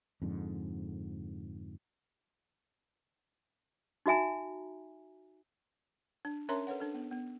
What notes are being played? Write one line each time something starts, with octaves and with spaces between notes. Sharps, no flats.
F2 G#2 D3
D#4 F#4 E5 G#5 A#5
D4
C#4 A#4 C#5 E5 A#5 C6
A4 B4 C#5 F#5
D4 A4
B3
B3